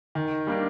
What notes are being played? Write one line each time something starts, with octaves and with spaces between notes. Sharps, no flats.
D#3
G3 A#3 D4